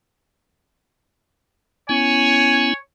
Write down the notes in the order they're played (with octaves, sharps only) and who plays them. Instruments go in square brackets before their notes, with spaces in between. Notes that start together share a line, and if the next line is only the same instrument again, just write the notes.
[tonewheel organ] B3 C#4 E4 [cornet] C#5 [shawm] G#5